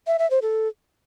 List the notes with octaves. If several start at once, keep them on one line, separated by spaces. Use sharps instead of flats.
E5
E5
C5
A4